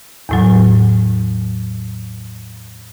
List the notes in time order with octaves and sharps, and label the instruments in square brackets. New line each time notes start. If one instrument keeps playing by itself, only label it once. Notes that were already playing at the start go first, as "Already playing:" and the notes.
[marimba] E2 A2 F#3